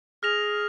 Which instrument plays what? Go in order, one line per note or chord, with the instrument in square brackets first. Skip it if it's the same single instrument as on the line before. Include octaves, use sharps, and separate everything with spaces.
[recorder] G#4 [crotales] F6 A#6 F7